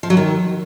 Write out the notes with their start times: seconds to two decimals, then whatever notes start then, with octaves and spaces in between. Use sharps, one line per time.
0.03 F3
0.10 F#3
0.17 D#3